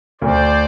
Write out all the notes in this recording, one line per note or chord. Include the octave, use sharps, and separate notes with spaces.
D2 C5 D5